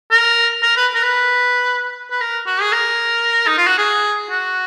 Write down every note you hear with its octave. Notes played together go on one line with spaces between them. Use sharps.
A#4
A#4
B4
A#4
B4
B4
A#4
F#4
G#4
A#4
D#4
F4
F#4
G#4
F#4